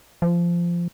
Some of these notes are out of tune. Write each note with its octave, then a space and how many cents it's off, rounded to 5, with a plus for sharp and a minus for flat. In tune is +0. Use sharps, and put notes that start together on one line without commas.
F3 -15